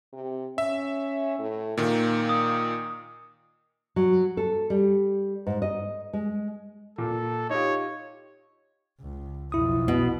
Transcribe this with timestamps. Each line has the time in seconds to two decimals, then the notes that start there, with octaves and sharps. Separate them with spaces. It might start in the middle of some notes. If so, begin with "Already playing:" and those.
0.13 C3
0.58 C#4 E5
1.39 A2
1.77 A#2 D#3 A#3
2.29 D#6
3.96 F#3
4.37 A4
4.70 G3
5.47 G#2
5.62 D#5
6.13 G#3
6.98 A#2 A4
7.50 D#4 F4 G4 C#5
9.00 C#2
9.52 B1 F2 E4 D#6
9.88 B2